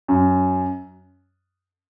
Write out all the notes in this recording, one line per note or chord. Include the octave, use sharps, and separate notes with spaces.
F#2